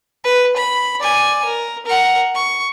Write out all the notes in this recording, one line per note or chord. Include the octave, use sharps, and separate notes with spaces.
B4
B5
D5 G#5
A#4
A#4 F#5
C#6